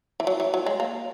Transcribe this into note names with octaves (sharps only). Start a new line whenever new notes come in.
E3
F#3
E3
F#3
G#3
A#3